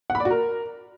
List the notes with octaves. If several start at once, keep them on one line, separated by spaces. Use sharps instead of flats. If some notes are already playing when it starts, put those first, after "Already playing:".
F#5
B5
D5
F#4
A#4